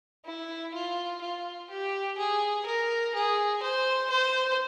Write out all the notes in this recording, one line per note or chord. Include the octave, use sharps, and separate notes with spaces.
E4
F4
F4
G4
G#4
A#4
G#4
C5
C5